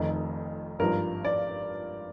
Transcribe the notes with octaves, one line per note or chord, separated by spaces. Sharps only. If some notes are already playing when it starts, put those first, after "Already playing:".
Already playing: F1 F2 D#3
G#1 G2 F3 A#4
D5